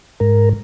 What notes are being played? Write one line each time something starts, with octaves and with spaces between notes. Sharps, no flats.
G#2 A#4